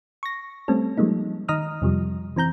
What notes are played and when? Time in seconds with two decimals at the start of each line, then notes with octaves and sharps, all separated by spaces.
0.23 C#6 A#6
0.68 G3 A3 C4 C#4 A4
0.97 F3 G3 G#3 A#3 D#4
1.48 D#3 D#5 A#5 D#6 F6
1.82 F2 C3 F3 G3
2.36 E3 C4 A#5 G6